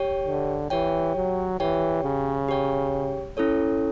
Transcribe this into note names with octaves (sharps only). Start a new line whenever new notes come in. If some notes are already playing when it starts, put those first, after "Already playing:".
Already playing: G4 C#5 G5
D3
E3 G4 C#5 G5
F#3
E3 G4 C#5 G5
C#3
G4 C#5 G5
C#4 E4 A4 C#5